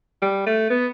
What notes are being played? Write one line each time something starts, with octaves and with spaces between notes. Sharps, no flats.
G3
A3
B3